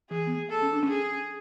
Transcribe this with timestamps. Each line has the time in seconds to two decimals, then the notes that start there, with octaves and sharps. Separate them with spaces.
0.10 E3 G#4
0.27 B3
0.36 A3
0.50 A4
0.62 C#4
0.73 D4
0.83 C#4
0.89 G#4